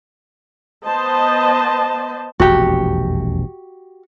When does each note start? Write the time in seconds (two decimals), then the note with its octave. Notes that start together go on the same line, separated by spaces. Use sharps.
0.84 B3 C5 D#5 A5
2.40 E1 A#1 F2 F#4 G4